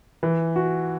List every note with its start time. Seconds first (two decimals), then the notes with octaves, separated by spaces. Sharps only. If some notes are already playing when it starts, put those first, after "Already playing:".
0.23 E3
0.56 F#4